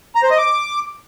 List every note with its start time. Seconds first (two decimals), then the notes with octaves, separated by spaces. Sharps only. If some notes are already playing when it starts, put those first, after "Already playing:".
0.15 A#5
0.23 C5
0.30 D#5
0.38 D6